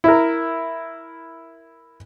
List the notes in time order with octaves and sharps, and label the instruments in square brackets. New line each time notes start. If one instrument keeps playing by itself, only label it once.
[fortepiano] E4 A#4